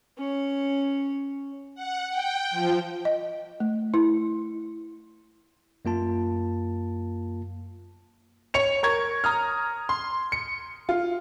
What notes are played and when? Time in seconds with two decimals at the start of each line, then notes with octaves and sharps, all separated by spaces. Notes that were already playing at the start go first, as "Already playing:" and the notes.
0.18 C#4 C#5
1.75 F#5
2.10 G5
2.51 F3
3.05 D#5
3.60 A3
3.94 E4
5.85 F#2 A#3 F4 A5
8.54 C#5 C#7 F7
8.83 A#4 C#6 G#6
9.24 A#5 D#6 F6
9.89 C6
10.32 C#7
10.89 F4